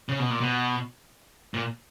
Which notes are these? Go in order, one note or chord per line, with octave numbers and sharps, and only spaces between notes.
C#3
B2
A#2
B2
A#2